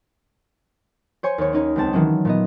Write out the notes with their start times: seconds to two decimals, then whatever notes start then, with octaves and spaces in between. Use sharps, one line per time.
1.23 C5 C#5 G#5 C#6
1.38 D#2 C#5
1.53 C#4 D#4 C#5
1.76 C#2 G#3 C4 A5
1.93 D#3 E3 F#3 C#4
2.25 A#2 B3 D#5